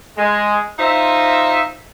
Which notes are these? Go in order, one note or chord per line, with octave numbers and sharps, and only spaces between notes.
G#3
D#4 F4 C5 D#5 E5